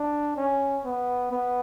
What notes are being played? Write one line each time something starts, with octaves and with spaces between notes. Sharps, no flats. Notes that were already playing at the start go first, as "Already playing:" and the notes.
Already playing: D4
C#4
B3
B3